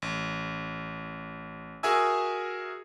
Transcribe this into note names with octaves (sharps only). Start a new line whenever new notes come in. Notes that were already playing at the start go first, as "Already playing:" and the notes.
A1
F#4 G#4 A#4 E5 G#5 E6